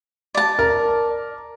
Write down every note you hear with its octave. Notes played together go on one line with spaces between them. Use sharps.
D5 A5
A#4